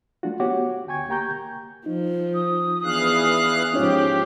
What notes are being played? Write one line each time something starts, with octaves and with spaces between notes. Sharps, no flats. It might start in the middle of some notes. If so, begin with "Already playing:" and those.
F#3 A3 D4 F4 F#4
B3 F#4 G4 C#5 F#5 D6
D2 D3 G5 G#5 C#6 G#6
A#3 G4 G5 A#5 C#6 G6
F3 D#4
D#6
E3 B3 D4 G#4 F5 F#6
G#2 F3 C#4 D#4 F4 G4 C#5